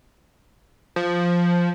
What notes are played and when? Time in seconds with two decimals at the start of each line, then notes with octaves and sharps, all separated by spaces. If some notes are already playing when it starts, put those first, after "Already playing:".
0.96 F3